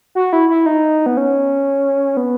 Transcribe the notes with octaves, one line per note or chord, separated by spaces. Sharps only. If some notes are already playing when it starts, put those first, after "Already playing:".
F#4
E4
E4
D#4
B3
C#4
B3